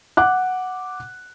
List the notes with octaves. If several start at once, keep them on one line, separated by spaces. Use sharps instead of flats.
F#5 D6 F#6